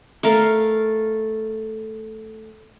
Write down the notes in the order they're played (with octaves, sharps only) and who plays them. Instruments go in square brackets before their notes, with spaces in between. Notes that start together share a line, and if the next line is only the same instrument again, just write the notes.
[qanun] A3 A4 A#4 F5